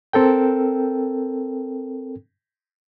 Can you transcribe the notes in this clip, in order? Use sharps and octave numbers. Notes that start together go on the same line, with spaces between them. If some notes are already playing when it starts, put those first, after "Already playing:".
C4 A4 A#4 G5